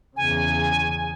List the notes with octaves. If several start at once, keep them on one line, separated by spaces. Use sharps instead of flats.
E2 C#3 G#5